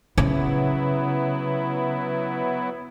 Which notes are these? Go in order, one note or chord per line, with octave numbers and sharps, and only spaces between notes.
C#3 F#3 B3 E4